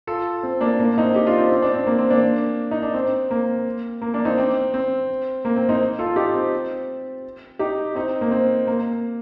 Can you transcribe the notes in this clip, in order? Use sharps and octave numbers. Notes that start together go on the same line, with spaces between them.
F4 A4
C4
A#3 D4
A#3 D4
C4 D#4
D#4 G4
D4 F4
C4
C4
D4
C4
A#3
C4
A#3 D4
D#4
D4
C4
A#3
A#3
A#3 D4
C4 D#4
C4
C4
A#3
C4
C4 D#4
F4 A4
D#4 G4
C4
D#4 G4
C4 D#4
A#3
C4
A#3